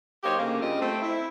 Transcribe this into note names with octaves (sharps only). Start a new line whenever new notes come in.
F#3 A#3 D#4 G4 C5 C#5
D2 C#3 A3 A#3
G2 C#3 G3 C4 F4 D#5
A3 C4
E4